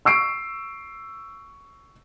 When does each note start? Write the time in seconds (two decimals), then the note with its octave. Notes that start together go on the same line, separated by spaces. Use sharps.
0.05 C#6 E6 C7 D7